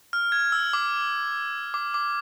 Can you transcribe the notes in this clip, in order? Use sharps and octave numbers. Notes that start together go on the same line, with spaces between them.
F6
G#6
E6
D6
D6
D6